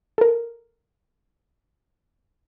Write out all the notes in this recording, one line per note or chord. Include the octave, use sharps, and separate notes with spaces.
A4 A#4